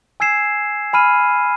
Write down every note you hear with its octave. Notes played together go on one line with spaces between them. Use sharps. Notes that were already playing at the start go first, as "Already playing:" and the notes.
G#5 E6 G#6 C7 E7
G#5 B5 F6 D#7